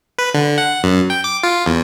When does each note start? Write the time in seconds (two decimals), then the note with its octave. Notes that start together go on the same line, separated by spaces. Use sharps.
0.18 B4
0.34 D3
0.58 F#5
0.84 F#2
1.10 G5
1.24 D6
1.43 F4
1.66 E2